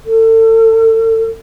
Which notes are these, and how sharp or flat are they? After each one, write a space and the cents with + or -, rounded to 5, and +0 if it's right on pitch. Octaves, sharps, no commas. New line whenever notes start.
A4 +35